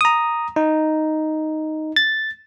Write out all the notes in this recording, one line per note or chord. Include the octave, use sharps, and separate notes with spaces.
A#5 D#6
D#4
A6